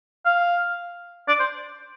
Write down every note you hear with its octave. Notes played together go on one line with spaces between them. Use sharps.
F5
D5
C5